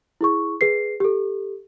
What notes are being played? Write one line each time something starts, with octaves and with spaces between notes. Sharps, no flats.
E4 G#4 C#6
G#4 B4 C7
G4 A4